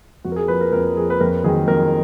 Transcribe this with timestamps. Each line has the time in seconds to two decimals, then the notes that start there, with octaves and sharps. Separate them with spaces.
0.24 F2 F#4
0.32 A#4
0.36 G#4
0.48 F3 B4
0.61 A#4
0.73 F2 A#4
0.96 F3 G#4
1.10 B4
1.20 F2 A#4
1.44 D#3 F#3 G#4
1.67 F2 A#4